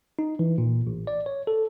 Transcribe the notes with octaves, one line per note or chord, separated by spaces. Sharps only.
D#4
E3
A#2
A1
D5
C#5
A4